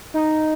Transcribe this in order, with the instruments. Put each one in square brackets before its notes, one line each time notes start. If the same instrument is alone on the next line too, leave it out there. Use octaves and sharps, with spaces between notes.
[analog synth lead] D#4